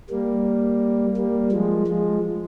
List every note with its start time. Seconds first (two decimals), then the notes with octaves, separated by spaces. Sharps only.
0.10 G3 A#3
1.17 G3 A#3
1.52 F3 G#3
1.87 F3 G#3